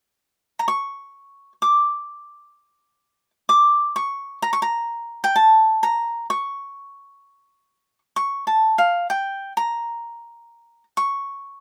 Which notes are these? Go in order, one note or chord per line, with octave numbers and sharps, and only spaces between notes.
A#5
C#6
D6
D6
C#6
A#5
C#6
A#5
G5
A5
A#5
C#6
C#6
A5
F5
G5
A#5
C#6